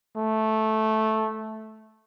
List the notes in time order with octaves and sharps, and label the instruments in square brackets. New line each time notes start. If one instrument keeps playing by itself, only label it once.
[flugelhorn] A3